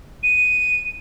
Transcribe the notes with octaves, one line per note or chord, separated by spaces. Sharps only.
D#7